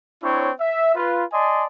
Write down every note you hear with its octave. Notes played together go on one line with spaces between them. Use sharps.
C4 D4 E4 C#5
E5
F4 B4
D5 D#5 G#5 A5 C6